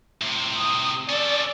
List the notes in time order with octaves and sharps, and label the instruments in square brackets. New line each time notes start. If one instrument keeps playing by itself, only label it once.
[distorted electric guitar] A2 C3
[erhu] D#6
[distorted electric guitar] C#4 A4 [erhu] D5